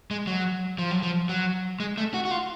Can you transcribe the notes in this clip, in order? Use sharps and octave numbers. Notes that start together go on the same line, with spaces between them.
G#3
F#3
F3
F#3
F3
F#3
G#3
A3
F#4
F#4
F4